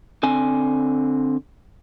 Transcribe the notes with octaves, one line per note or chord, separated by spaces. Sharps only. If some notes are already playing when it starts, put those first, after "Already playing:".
D3 C4 G#5